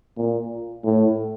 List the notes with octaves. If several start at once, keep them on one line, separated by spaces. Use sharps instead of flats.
A#2
A2